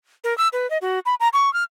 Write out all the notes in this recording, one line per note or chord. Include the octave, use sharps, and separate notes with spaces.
A#4
E6
B4
D#5
F#4
B5
A#5
C#6
F6